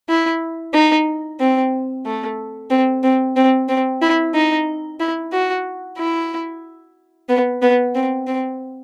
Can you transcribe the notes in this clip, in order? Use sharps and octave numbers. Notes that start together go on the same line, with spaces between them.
E4
D#4
C4
A3
C4
C4
C4
C4
E4
D#4
E4
F#4
E4
B3
B3
C4
C4